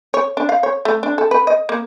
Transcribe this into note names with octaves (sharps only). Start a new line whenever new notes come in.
C#5
D4
F5
C#5
A3
D4
A4
B4
D#5
A#3